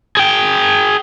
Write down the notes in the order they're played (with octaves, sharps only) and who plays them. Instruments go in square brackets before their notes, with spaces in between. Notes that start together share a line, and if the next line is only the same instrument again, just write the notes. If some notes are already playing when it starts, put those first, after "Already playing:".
[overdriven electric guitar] G#4 G5